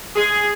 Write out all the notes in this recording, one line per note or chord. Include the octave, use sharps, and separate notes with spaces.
G#4